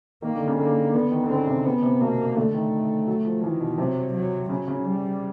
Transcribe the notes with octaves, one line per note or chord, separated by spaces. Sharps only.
D#3 A#3
D3
C#3
D3 A#3
D3 B3
D#3
D3
C#3 C4
C3
C#3 B3
C3
B2 A#3
D3 A3
D#3
F#3
F3
D#3 E3
B2
C3 F#3
F#3
C#3 F#3
C#3
G3